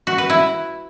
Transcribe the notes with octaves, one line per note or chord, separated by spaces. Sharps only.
F#4
B4
E4